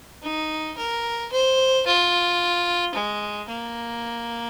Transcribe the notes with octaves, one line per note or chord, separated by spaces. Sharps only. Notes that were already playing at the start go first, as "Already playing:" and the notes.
D#4
A#4
C5
F4
G#3
A#3